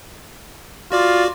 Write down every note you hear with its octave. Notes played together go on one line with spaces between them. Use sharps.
F4 F#4 D5 D6